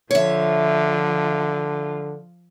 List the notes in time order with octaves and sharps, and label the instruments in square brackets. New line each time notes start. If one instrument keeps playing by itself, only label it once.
[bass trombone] D3 [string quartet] F3 F4 [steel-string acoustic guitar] C#5 E5